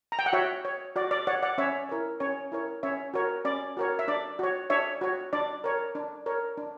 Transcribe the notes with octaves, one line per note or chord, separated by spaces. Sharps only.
A#5
G5
F#5
F#4 C#5 E5
C#5
F#4 D5
D5
C#5 D5 F#5
D5 F#5
C#4 C#5 E5
E4 A#4 C#5
C#4 C#5
E4 A#4 C#5
C#4 C#5 E5
F#4 A#4 C#5
C#4 D5
F#4 A#4 C#5
E5
D4 D5
F#4 C#5
D4 C#5 E5
F#4 C#5
D4 D5
A#4 C#5
D4
A#4 C#5
D4